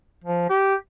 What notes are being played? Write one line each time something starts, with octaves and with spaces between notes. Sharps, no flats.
F3
G4